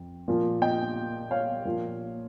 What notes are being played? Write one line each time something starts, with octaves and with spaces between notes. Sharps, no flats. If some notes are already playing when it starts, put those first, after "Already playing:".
Already playing: F2
A#2 F3
D#5 G5
C#5 F5
A#2 F3